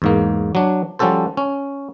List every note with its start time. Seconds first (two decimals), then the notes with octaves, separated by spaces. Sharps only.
0.02 E2 G#2 A#3
0.55 F#3 D4
0.99 F3 G3 C#4 F#4 A4 C5
1.37 C#4